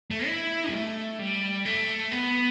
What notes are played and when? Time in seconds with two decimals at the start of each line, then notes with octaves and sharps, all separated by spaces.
0.11 A3
0.26 E4
0.69 G3
0.71 A3
1.19 G3
1.65 A3
2.12 B3